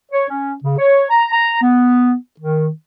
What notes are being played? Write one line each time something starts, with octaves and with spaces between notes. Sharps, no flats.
C#5
C#4
C#3
C#5
A#5
A#5
B3
D#3